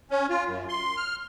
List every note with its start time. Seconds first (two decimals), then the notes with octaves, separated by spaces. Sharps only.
0.11 C#4
0.30 F4
0.47 F#2
0.69 C6
0.97 F6